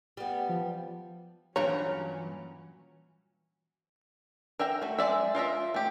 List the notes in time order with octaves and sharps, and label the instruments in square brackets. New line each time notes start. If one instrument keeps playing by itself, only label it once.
[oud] G3 B3
[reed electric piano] F3
[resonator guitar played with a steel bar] G2 A#2 A#5 [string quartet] E3 F#3 C#4 [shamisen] C#5
[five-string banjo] A#4 E5 G5 A#5
A3 F#4
G#3 C4 D5 E5
F4 A#4 D#5 E5
A3 G4